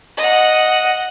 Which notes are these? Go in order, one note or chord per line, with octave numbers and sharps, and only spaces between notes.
D#5 F#5